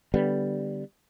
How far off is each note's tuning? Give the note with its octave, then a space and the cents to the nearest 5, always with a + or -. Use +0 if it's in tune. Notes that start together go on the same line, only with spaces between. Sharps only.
D3 +0 G3 +0 B3 +0